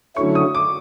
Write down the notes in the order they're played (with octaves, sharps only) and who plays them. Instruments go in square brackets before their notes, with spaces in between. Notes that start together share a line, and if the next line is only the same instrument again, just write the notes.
[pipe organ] D3 F#3 A3 C#4 E4 [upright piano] C#6
[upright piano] D#6
D6